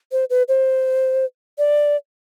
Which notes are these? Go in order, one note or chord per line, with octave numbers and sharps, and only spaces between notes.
C5
B4
C5
D5